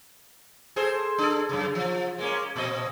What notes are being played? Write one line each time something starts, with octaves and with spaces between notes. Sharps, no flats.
G#4 A4 C5
D4 A4
F#2 C#3
F3
G#3 A#3 C#4
A#2 C4 D#5